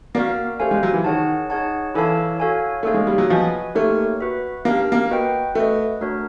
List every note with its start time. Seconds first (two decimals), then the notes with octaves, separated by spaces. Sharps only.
0.15 A#3 F#4 A#4 D5 F5
0.60 A3 G4 C5 F5 G#5
0.71 G#3
0.83 F#3
0.94 E3
1.04 D#3 G#4 C#5 F#5 A5
1.50 D#4 G#4 C#5 F#5 A5
1.94 E3 E4 A4 C#5 F5 A5
2.40 F#4 A4 C#5 F5 G#5
2.83 A3 A#3 D#4 G#4 C#5 F5
2.94 G#3
3.07 G3
3.18 F#3
3.30 F3 F#4 B4 D#5 G#5
3.75 A3 A#3 D#4 G4 A#4 C#5
4.21 F#4 B4 E5
4.65 A#3 D4 G4 A#4
4.92 A#3
5.11 F#4 B4 D#5 G5
5.55 A3 F#4 B4 D#5
6.01 A3 D4 F#4 A#4 C#5